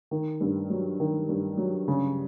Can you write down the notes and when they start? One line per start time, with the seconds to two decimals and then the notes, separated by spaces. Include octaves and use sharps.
0.11 D#3
0.41 G2
0.70 F#3
1.00 D#3
1.29 G2
1.57 F#3
1.88 C#3